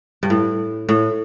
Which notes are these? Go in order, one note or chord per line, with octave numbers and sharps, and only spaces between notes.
G2
A2
A2